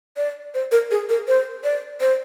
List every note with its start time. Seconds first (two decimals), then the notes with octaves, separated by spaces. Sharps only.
0.17 D5
0.54 C5
0.72 A#4
0.91 G#4
1.09 A#4
1.28 C5
1.64 D5
2.01 C5